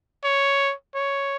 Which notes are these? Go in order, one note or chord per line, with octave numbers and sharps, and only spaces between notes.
C#5
C#5